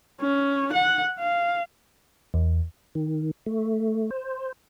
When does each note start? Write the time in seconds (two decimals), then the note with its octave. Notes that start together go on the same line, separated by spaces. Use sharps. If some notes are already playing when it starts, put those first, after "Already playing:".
0.21 C#4
0.73 F#5
1.19 F5
2.34 E2
2.95 D#3
3.46 A3
4.11 C5